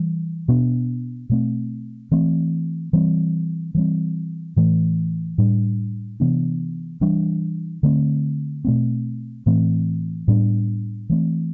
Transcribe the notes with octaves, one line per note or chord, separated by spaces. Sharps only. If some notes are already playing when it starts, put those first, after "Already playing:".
Already playing: E3 G3
B2 B3 D4
B2 A3 C4
E3 A3 C4
E3 G3 C4
E3 G3 C4
A2 E3 A3
A2 G3 D4
C3 E3 B3 D4
E3 G3 D4
D3 A3 C4
B2 A3 C4
A2 E3 A3 C4
A2 G3 B3 D4
E3 A3 C4